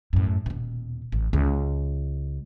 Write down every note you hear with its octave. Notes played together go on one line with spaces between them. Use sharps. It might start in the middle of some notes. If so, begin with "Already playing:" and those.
F#2 A2
D#1 B2
A1
C#2